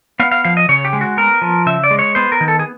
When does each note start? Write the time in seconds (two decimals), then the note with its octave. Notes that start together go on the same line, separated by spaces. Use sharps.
0.19 B3 F5
0.32 F5
0.45 F3 F5
0.57 D#5
0.69 C#3 C#5
0.85 G4
0.93 G#3
1.01 F#4
1.17 B3 A#4
1.42 F3
1.66 C#3 E5
1.84 D5
1.91 G#3
1.99 C#5
2.15 B3 C5
2.32 A#4
2.41 D#3
2.48 A4
2.59 G#4